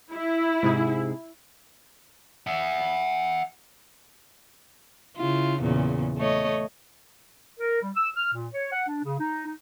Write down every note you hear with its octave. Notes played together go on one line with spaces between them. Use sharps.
E4
G#2 C3 G#4
E5 F#5
C#3 E4 F4
E2 A#2 C#3
A3 C#5 D#5
A#4
G3
E6
F6
A#2
C#5
F#5
D4
C#3
D#4
D#4